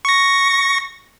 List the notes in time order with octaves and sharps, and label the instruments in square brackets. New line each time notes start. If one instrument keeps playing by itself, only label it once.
[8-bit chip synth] C#6 A#6